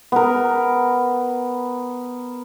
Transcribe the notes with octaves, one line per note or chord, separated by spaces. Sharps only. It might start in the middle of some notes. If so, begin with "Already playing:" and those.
B3 A#4